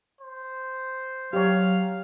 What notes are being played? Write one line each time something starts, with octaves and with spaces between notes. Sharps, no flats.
C5
F#3 G4 C#5 F5